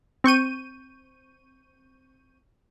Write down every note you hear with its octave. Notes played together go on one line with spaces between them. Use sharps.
C4 C#6 G6 D#7